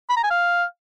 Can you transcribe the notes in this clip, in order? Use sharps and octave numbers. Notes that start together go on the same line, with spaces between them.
B5
A#5
G#5
F5